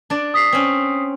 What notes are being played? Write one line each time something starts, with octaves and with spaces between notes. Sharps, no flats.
D4 D5
D#6 B6 C7
C4 C#4